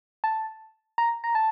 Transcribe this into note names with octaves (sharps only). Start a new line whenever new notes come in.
A5
A#5
A#5
A5